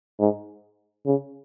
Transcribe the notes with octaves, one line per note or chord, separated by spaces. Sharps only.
G#2
C#3